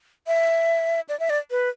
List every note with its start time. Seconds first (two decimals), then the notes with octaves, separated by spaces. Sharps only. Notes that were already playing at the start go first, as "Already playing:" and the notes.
0.27 E5
1.09 D5
1.20 E5
1.30 D5
1.51 B4